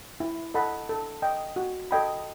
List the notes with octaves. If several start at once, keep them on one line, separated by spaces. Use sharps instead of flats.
E4
A4 D#5 F#5 B5
A4
D#5 G5
F#4
A4 D#5 G5 B5